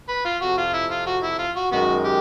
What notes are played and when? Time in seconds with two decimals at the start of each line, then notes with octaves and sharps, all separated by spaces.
0.09 B4
0.25 F4
0.41 F2 C3 F3 F#4
0.58 F4
0.73 E4
0.91 F4
1.06 F#4
1.23 E4
1.39 F4
1.56 F#4
1.71 F#2 D#3 G#3 B3 F#4
2.05 G4